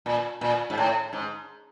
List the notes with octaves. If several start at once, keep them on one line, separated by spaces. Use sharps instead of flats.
A#2
A#2
G#2
A2
G#2